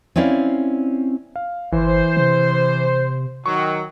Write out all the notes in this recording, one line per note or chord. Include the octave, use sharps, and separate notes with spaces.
C4 C#4 E4 D5 E5 F5
F5
G1 E3 C5
C3
D#3 F#3 C#6